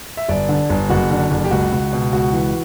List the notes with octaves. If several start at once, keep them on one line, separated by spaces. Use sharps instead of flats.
E5
G1 D5
D3
G1
F#1 F#4
D3
F#1
G4
C#2 F#4
C#2
B2
C#2 F#4
E3